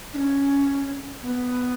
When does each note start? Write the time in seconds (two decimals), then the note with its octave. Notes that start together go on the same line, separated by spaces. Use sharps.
0.13 D4
0.18 C#4
1.22 B3